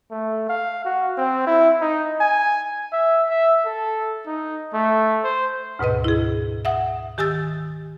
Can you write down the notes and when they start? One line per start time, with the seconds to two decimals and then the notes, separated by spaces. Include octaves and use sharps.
0.11 A3
0.49 F5
0.85 F#4
1.17 C4
1.47 E4
1.81 D#4
2.21 G#5
2.92 E5
3.29 E5
3.65 A4
4.26 D#4
4.73 A3
5.23 C5
5.79 D2 G#2 B2 B4 D#5
6.04 E4 G#4
6.65 E5 F#5 D#6
7.18 D#3 G4 G#5 D#6 E6 A6